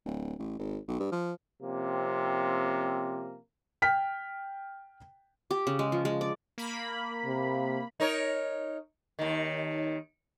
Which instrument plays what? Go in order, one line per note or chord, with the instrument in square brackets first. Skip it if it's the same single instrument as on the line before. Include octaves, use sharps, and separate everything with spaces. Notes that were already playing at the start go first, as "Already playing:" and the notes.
[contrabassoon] D1
A1
G#1
B1
G2
F3
[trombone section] C3 F3 A#3 C4 C#4
[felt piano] G5 F6 B6
[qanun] G4
C#3
G#3
F3
G#3
D5
[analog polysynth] A#3 B5
[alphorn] C3
[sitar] D#4 A#4 C#5
D#2 D#3